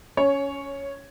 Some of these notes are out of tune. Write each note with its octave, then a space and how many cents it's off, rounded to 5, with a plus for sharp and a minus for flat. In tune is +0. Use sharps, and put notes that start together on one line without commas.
C#4 +15 C#5 +0